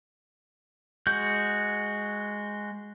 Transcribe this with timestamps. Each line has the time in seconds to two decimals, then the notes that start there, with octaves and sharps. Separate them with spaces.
1.07 G#3 F#4 G6